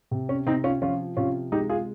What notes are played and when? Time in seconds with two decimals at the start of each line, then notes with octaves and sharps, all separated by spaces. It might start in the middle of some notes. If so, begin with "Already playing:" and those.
0.11 C3
0.29 C#4
0.47 C3 C4 D#4
0.64 C#4 F4
0.82 F3 C#4 F4
1.17 C3 C#4 F4
1.52 G#3 D#4 G4
1.69 F4 G#4